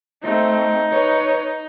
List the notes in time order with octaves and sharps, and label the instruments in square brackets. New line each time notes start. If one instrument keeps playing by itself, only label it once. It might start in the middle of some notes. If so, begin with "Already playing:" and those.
[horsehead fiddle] A3 C4 [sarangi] D#4
[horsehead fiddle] B4 C#5